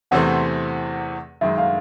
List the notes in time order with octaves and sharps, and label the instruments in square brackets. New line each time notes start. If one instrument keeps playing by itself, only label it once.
[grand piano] E2 C3 E3 A3 C4 [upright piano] F#5
[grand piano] F#2 D#3 G#3 [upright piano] E5
[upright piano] F5